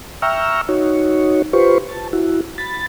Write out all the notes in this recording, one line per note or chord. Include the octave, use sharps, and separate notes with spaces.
E5 G5 A#5 C#6 E6 F6
D#4 F#4 C#5
F4 G4 B4 C5 C#6
A5
E4 F#4
B5 A6